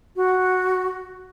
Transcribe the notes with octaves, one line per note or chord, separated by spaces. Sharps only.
F#4